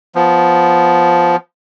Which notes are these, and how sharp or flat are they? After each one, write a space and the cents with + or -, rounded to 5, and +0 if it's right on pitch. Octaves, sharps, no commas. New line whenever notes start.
F3 +0 B3 +5